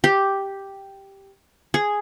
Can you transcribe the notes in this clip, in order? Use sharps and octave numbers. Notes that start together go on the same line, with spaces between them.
G4
G#4